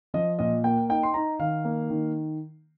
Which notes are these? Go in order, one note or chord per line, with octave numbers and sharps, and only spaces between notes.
F3 D#5
A#2 D#5
A#3 G5
D#4 G5
C6
D#4 A#5
D#3 F5
A#3
D#3